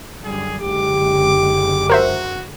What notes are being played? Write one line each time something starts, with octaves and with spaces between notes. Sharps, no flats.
F#2 D3 G3 G#4
F#1 D3 G#3 G4 D6
F#4 A#4 C5 E5